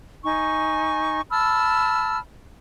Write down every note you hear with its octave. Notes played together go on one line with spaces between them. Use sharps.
D#4 G#5 C#6
A5 B5 E6 F6